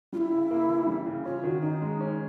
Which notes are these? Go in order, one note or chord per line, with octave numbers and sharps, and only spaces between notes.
G3 E4 F4
C#3
A#3
E3
G3
C#3
C#4 F4
D#3 F#4
D#3 D#4
G#3
C#4